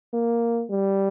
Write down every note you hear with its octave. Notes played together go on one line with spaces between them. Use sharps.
A#3
G3